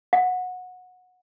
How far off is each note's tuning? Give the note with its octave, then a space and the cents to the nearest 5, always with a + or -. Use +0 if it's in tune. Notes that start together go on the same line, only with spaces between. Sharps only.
F#5 -20